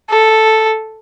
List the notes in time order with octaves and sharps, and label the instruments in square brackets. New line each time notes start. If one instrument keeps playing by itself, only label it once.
[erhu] A4